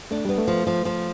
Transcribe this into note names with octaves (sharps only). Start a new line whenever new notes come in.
A3 D4
G3 B3
A3
F3
F3
F3